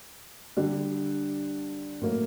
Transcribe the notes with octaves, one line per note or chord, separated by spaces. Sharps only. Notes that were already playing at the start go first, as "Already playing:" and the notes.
D3 G3 D4
A2 F#3 A#3